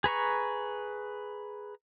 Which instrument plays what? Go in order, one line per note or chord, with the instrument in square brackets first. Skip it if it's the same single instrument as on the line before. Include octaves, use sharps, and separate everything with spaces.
[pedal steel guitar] G#4 B4 A#5 C#6